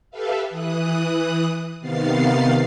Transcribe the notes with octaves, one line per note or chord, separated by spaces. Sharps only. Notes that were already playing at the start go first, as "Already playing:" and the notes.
G4 A4 B4 E5 F5
E3 D#6 F#6
C3 D#3 B3 F5 A6 C7